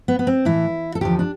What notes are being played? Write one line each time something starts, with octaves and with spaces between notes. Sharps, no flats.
B3
B3
C4
A2 E3 E4
A4
E2 D3 F3 G4
D4